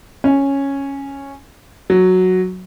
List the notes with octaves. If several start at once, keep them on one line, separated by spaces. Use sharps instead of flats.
C#4
F#3